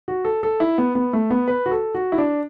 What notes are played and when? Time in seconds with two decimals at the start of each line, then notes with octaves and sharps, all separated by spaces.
0.08 F#4
0.25 A4
0.43 A4
0.60 E4
0.78 B3
0.95 B3
1.13 A3
1.30 B3
1.48 B4
1.66 F#4
1.71 A4
1.94 F#4
2.12 E4
2.18 D4